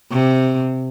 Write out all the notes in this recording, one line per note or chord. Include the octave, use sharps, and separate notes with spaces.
C3